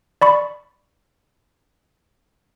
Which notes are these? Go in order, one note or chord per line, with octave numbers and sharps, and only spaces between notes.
D5 B5 C#6